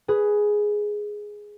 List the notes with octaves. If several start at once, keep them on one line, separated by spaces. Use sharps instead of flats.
G#4 B4